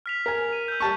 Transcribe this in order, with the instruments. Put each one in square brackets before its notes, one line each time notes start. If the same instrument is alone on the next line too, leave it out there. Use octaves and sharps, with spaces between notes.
[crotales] F6 B6 F7
[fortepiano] A#4 G#5
[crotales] D#7
E6 G6
[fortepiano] G3 A5 C#6